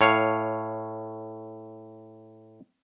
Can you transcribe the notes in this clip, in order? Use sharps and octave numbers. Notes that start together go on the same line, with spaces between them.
A2 C#5 F5